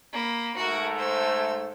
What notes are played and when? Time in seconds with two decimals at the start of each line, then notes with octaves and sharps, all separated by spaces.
0.13 A#3 B5
0.57 G#2 A3 F#4 A#4
0.96 C5 E6